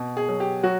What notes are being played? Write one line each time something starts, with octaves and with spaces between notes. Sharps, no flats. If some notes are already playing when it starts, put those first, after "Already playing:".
Already playing: B2
G#4
F#3
G4
F#3 F#4